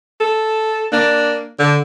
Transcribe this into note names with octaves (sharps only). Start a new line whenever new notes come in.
A4
A#3 D4
D3 D4